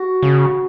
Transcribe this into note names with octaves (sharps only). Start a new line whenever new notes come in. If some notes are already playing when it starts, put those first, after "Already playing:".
Already playing: F#4
C#3